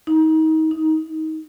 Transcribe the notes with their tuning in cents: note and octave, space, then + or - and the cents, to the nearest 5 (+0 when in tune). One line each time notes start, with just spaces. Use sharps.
D#4 +30
D#4 +15